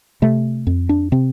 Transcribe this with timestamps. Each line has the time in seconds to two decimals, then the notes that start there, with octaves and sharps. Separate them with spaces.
0.22 C3 A3
0.67 F2
0.89 D4
1.12 C3 C4